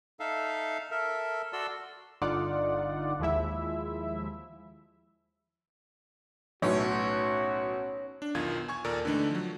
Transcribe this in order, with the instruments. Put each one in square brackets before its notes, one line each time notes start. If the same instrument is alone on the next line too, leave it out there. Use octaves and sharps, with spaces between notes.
[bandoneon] D#4 A4 E5 F5
A4 A#4 E5
F#4 A4 D5 C6 E6
[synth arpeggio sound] G1 D3 D#4 F4 D5 F#5
D#2 F3 G#3 E4 E5
[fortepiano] B1 A2 F#3 [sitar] C#4 [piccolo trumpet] F#4
[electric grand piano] D4
B1 E2 D#3 F4 G#6
G#5 C#6 G#6
D#2 A#2 A4 A#4 D5
D3 E3 A3 D4 D#4
F3 F#3